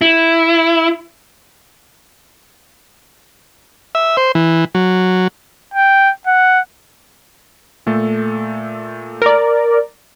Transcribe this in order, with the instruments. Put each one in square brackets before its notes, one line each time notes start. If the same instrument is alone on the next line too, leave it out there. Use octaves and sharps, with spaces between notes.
[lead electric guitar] E4
[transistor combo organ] E5
C5
E3
F#3
[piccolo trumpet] G5
F#5
[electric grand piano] A#2 A3 A4
[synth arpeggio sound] A#4 D5